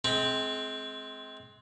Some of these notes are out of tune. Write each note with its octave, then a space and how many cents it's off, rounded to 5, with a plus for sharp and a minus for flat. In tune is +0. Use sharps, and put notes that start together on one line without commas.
G#3 +35 C4 +0